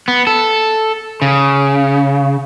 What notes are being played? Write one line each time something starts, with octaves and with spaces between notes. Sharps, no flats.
B3
A4
C#3